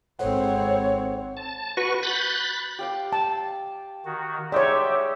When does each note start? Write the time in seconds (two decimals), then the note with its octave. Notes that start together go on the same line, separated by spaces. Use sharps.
0.19 G#1 C4 A4 C5 C#5 F#5
1.37 A5
1.77 F#4 B4 C#6
2.03 B5 F#6 G6 A6
2.79 G4 F5 G5
3.12 A5
4.05 D#3 F#4
4.52 G#3 D#4 G4 C#5 D5 E5 F#5